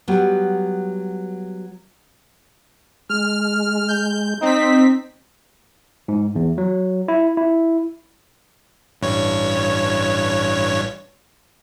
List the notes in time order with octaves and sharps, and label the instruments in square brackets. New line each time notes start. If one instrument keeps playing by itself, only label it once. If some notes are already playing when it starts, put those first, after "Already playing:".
[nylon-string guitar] F#3 G3 B3
[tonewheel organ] G#3 [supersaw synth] F6
[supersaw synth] G6
[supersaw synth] C4 B6 [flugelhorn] D#4
[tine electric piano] G#2
E2
F#3
E4
E4
[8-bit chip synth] A1 G2 C#5